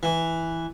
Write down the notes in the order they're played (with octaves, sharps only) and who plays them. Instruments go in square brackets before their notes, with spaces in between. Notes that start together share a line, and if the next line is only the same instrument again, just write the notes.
[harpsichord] E3